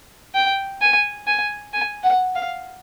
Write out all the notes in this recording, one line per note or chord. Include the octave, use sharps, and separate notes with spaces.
G5
G#5
G#5
G#5
F#5
F5